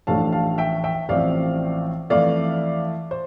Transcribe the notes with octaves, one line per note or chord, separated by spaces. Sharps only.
A1 A2 F3 A3 D4 F5 A5
F5 A5
E5 G5
E5 G5
A1 A2 F3 C4 D5 F5
F2 E3 A3 D5 F5
C5